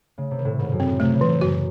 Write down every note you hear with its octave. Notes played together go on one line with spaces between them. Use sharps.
C#3 A3
C3
D#3
A2
G#2 D#3
F#2
C4
A2
C3 A3
C#3
E3
C3
F#2 F#4